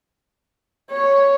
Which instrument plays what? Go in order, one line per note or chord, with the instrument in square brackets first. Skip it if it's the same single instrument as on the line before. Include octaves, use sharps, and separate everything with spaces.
[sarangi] C#5